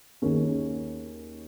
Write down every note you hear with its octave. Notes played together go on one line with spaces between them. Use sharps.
D#2 D#3 A#3 C#4 G#4